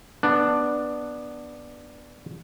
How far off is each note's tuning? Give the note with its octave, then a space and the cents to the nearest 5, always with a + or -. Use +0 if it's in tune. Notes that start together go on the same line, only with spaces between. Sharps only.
B3 -5 D4 +5